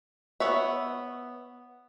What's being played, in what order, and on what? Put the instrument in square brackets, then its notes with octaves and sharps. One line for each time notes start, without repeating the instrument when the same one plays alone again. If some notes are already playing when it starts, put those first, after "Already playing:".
[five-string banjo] B3 C#5 E5